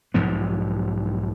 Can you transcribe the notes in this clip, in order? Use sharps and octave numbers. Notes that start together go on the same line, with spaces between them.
B1 G#2 F3 B3